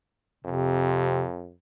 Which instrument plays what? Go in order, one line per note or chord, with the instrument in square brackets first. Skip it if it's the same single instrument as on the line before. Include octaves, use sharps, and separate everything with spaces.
[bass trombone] F2 [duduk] C3